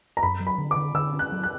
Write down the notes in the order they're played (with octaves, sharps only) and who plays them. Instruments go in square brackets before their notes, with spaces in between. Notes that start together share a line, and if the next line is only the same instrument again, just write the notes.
[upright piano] A#5
[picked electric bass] F#2 [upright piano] B5
[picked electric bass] F#3
[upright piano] B5
[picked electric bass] D3
[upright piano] D6
[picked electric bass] D3
[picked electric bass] D3 [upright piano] E6
[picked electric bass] C#4
[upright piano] F#6
[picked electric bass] F#3
[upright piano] F#6